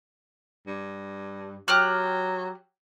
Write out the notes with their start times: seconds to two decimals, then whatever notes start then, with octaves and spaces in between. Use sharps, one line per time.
0.67 G2
1.68 F#3 G4 F6 F#6